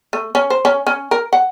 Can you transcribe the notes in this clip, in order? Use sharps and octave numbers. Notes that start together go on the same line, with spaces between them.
A3
C#4
C5
C#4
C#4
A#4
F#5